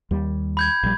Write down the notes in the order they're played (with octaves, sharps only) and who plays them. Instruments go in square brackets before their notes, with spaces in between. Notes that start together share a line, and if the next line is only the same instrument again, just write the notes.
[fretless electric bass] D#2 G3
[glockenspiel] B5 G6 G#6
[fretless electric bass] A#1 G3